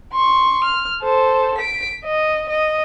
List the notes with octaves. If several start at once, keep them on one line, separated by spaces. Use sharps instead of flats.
C6 C#6
F6
A4 C5
B6 D7
D#5
D#5